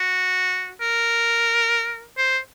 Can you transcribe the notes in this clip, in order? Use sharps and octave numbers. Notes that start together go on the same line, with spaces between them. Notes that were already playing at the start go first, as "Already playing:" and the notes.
Already playing: F#4
A#4
C5